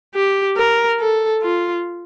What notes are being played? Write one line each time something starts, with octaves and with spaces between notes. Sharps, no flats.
G4
A#4
A4
F4